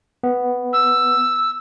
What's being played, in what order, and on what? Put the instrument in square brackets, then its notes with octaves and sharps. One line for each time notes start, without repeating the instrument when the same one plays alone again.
[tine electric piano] B3
[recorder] E6